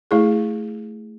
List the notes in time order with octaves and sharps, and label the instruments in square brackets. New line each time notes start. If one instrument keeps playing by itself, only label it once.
[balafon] A3 E4 G#4